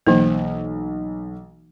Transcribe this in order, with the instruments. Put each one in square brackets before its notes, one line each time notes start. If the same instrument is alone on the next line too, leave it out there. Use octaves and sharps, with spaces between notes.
[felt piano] B1 [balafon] E3 A#3